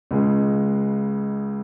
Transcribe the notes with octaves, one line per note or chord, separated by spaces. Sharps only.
C#2 C#3 G#3